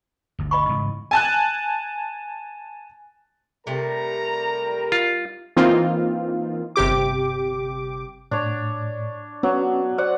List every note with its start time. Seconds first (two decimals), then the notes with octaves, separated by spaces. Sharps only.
0.39 G1 D2
0.51 D#5 B5 C#6
0.69 G#2 C#3 E3
1.11 G#5 A5 F#6
3.67 C3 G3 A3 A#4 A#5
4.92 F4
5.56 E3 A#3 C4 D#4 F4
6.76 G1 C3 G4 D6
8.31 A2 D4 C#5
9.43 F#3 B3 C#4
9.98 C5 D5 F#5